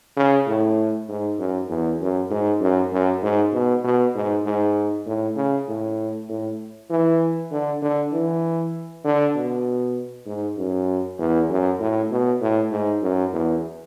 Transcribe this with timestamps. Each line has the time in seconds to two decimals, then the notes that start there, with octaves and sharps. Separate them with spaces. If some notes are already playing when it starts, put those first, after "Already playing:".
0.17 C#3
0.47 A2
1.09 G#2
1.39 F#2
1.69 E2
2.01 F#2
2.31 G#2
2.61 F#2
2.92 F#2
3.22 G#2
3.53 B2
3.84 B2
4.15 G#2
4.46 G#2
5.07 A2
5.36 C#3
5.68 A2
6.29 A2
6.90 E3
7.51 D3
7.82 D3
8.12 E3
9.04 D3
9.35 B2
10.27 G#2
10.58 F#2
11.19 E2
11.49 F#2
11.80 A2
12.11 B2
12.41 A2
12.72 G#2
13.03 F#2
13.33 E2